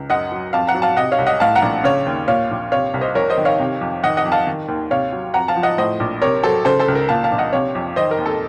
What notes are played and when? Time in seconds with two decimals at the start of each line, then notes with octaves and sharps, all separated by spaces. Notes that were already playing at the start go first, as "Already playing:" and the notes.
Already playing: C#2
0.10 F#2 D#5 F#5
0.32 F#3
0.53 F2 F5 A5
0.67 F#5 A#5
0.75 F#3
0.82 F5 A5
0.97 C3 D#5 F#5
1.12 C#5 F5
1.18 C2
1.27 D#5 F#5
1.40 A2 F5 A5
1.55 F#5 A#5
1.62 A#1
1.84 C#3 C#5 F5
2.06 D#2
2.28 A#2 C#5 F5
2.51 A#1
2.72 C3 C#5 F5
2.94 C2
3.01 C5 D#5
3.15 F2 A#4 C#5
3.30 C5 D#5
3.38 D#3
3.45 C#5 F5
3.59 C3
3.81 F2
4.04 D#3 D#5 F#5
4.17 D#5 F#5
4.25 F2
4.32 F5 A5
4.47 D#3
4.68 D#2
4.91 C3 C#5 F5
5.12 F#3
5.34 F2 F#5 A#5
5.48 F5 A5
5.56 F3
5.63 D#5 F#5
5.78 A2 C5 D#5
6.00 A#1
6.22 C3 A#4 C#5
6.43 F#3 A4 C5
6.65 C#3 A4 C5
6.79 A4 C5
6.88 C#2
6.95 A#4
7.09 A#2 F5 A5
7.24 F5 A5
7.32 A#1
7.38 D#5 F#5
7.53 C3 C#5 F5
7.75 F2
7.96 D#3 C5 D#5
8.11 A#4
8.18 D#2
8.26 A4